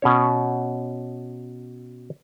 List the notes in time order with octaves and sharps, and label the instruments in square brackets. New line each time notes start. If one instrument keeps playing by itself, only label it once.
[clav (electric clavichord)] B2 C#4 C#5